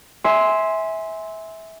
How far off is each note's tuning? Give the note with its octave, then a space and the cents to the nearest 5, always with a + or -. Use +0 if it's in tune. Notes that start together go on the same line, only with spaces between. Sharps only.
E5 -20 G#5 +0 C6 +0